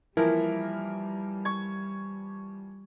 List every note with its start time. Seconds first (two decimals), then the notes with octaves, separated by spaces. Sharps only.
0.17 E3 F3 G3 A#3 E4 A#4
1.45 C#6 G#6